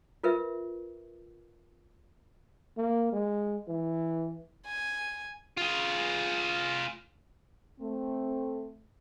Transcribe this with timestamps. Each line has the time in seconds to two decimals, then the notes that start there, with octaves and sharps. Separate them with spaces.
0.23 F4 A#4 B4 E5
2.77 A#3
3.12 G#3
3.68 E3
4.66 G#5
5.57 F4 G#4
7.80 A3 C4